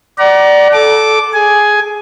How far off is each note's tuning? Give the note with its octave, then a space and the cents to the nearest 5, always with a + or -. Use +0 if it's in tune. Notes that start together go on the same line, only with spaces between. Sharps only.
D5 +0 F#5 +35 A#5 +20
A4 -15 D6 +0
G#4 +5 G#5 +10